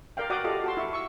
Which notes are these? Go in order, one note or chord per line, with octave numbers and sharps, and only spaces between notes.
A#4 D5 F5 G5
F#4 D5 F#5 G5 D6 D#6
F4 G4 A4 D5 D#5 F5
F#4 A5 C6
E4 E5 C#6
C#6 E6